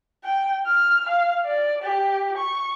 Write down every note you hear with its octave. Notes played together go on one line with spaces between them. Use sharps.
G5
F6
F5
D5
G4
C#6